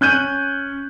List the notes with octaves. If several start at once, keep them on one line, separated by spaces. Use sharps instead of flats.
C#4 F#6 G6 D#7